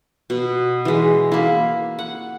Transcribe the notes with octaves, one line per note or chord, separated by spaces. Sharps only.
B2
E3 G#3
A#3 E4
F#5